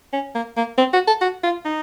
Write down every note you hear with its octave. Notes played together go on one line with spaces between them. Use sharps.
C#4
A#3
A#3
C4
F#4
A4
F#4
F4
D#4